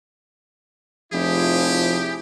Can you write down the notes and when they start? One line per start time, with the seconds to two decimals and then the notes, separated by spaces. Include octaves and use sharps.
1.13 F1 F3 E4 G4 G#4